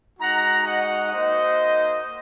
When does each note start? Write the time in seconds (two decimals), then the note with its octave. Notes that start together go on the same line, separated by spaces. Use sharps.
0.19 G#3 D#4 F#4 F#5 A#5
0.66 D#5 F#5
1.12 A#3 D#4 F#4 C5 D#5